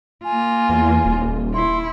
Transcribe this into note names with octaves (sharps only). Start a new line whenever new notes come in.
A#3 F4 G#5
E2
D#1
E4 C6